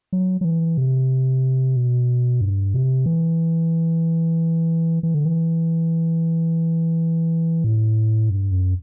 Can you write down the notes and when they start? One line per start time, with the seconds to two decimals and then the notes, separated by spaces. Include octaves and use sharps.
0.13 F#3
0.41 F#3
0.45 E3
0.78 C3
1.76 B2
2.41 G2
2.74 C3
3.06 E3
5.03 E3
5.14 D3
5.25 E3
7.64 A2
8.30 G2
8.51 F#2